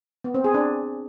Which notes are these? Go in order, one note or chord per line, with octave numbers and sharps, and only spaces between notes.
B3
C4
G#4
D4